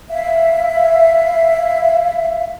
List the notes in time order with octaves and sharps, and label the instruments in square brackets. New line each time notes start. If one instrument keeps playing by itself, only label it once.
[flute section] E5 F5